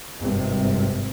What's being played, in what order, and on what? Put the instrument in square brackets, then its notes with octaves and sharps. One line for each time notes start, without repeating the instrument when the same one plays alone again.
[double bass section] G#1 G2 C3